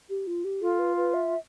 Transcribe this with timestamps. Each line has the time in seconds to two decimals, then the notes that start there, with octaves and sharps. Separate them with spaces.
0.10 G4
0.27 F4
0.45 G4
0.61 F4 A4
0.79 B4
0.97 B4
1.14 E5